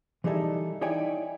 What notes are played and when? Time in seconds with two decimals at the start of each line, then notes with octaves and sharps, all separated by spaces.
0.24 E3 G3 D#4 G#4 A4 E5
0.81 D#4 E4 C#5 D5 G5 G#5